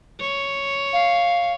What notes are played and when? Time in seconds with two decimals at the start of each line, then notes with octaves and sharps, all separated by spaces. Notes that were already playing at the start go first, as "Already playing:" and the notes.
0.20 C#5
0.93 F5